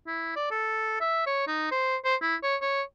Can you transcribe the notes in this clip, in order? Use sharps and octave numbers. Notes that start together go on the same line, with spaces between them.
E4
D5
A4
E5
C#5
D#4
C5
C5
E4
C#5
C#5